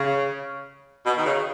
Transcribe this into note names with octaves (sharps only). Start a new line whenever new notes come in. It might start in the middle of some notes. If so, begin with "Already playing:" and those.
Already playing: C#3
B2
D#3
C#3